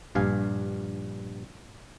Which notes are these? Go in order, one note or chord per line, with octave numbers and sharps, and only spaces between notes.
A#1 G2 F5 G#5